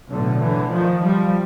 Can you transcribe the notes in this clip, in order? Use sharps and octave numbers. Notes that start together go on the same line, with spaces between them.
B1 A2 D3
D3 E3
D#3 F3
F3 G3